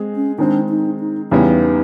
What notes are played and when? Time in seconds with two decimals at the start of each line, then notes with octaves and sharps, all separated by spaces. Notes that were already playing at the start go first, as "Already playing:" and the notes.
Already playing: G#3 C4 G#4
0.16 C#4
0.38 D#3 G#3 C4 D4
0.69 D#4
1.00 D#4
1.31 E2 C#3 E3 G3 B3 D#4